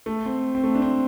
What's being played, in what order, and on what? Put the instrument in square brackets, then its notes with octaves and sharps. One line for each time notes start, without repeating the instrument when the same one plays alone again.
[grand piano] A3
C4
C4
A3
D4
C4